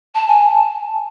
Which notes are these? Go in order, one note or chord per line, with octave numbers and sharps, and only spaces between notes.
A5
G#5
A5